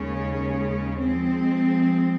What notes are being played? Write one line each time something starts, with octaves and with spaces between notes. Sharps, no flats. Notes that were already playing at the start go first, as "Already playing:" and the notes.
Already playing: D#2 C#3 G#3 C#4
F3 G#3 C4